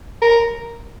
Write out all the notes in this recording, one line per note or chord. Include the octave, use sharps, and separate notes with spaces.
A#4